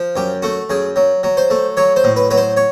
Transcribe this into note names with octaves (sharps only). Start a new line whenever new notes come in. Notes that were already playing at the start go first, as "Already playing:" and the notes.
Already playing: F3
F#2 G4
A3 F#4
F#2 G#4
F#3
F#3
C5
A3
F#3 C#5
C5
A2
B4
F#3 B4
C5
C#5